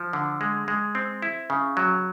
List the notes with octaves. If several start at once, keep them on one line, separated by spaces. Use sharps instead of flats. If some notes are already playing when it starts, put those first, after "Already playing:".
Already playing: F3
D3
G#3
G#3
C4
E4
C#3
F#3